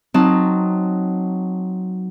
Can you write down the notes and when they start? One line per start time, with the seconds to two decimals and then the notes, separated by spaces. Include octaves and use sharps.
0.14 F#3 C4 D#4 A5